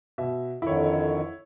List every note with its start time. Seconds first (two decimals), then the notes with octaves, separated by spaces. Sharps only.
0.18 B2 E5
0.62 F2 D3 D#3 E4 C#5